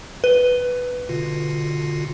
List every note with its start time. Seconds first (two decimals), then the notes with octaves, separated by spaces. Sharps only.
0.24 B4
1.09 B2 D3 F4